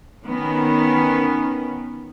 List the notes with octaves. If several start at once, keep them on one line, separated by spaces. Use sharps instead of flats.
D#3 B3 C#4